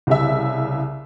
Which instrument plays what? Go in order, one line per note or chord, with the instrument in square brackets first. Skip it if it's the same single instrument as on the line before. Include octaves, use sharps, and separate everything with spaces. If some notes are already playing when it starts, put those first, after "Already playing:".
[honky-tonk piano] C2 C#3 E5